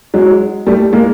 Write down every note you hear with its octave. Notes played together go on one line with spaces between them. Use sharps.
F#3 G#3
G3 A3
G#3 A#3